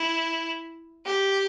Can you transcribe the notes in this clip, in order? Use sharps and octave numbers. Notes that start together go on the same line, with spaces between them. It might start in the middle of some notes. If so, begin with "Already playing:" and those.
Already playing: E4
G4